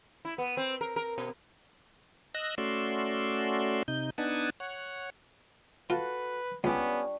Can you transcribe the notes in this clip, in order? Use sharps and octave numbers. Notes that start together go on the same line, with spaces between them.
E4
B3
C4
A#4
A#4
B2
D#5 E6 F#6 A#6
A3 C#4 F#4 D5 C6 E6
C3 D#4 G6
B3 D4 D#4 F#5 G#5 A5
C#5 F#5
F4 F#4 A4 B4
C#2 G3 B3 C#4 D4 G4 G#5 C#6